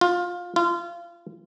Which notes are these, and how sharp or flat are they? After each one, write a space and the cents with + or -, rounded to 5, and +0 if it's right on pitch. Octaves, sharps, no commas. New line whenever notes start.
F4 +20
F4 -25